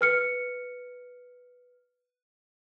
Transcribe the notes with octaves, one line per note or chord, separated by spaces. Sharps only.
B4 F6 C#7